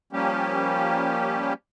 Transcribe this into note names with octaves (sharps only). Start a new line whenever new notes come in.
F3 G3 A#3 C#4 G4